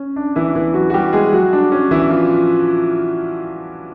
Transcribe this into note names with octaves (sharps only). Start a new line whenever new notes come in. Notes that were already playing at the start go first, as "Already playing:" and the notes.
Already playing: C#4
D4
E3 E4
E3 E4
F#3 F#4
F#4
G3 G4
G#3 G#4
F#3 F#4
D4
C#4
E3 E4
F3 F4